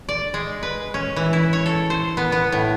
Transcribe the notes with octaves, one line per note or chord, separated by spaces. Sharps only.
D5
G#3
B4
C#4
E3
E4
C#5
A4
C5
B3
B3
A2